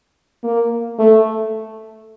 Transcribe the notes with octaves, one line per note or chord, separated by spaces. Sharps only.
A#3
A3